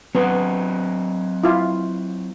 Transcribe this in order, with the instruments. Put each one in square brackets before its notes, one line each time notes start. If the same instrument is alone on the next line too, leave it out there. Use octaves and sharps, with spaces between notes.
[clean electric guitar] F#3 C4 [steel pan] B3
[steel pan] E4 F4